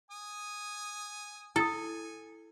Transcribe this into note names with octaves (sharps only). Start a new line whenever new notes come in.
G#5 D#6
E4 A4 G#5 D#6